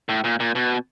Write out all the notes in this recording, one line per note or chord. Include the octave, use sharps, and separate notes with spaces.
A2
A#2
A#2
B2